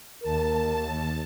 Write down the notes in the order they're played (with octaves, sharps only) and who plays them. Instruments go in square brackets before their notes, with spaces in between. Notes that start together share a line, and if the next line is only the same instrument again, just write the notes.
[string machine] D#2 A5 [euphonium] A#4